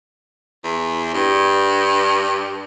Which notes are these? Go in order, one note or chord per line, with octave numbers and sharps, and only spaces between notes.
E2
G2